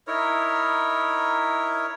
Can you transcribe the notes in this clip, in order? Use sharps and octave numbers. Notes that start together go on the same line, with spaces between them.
D#4 E4 A#4 C#5